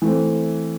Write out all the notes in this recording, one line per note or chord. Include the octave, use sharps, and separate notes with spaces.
E3 A3 C4